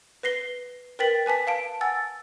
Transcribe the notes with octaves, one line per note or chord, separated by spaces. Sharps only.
B4 A#6 C7 G7
A#4 B4 G5 A6 B6 F#7
B4 G#5 A5 B6
F5 A5 D7
F#5 G#5 E6 A6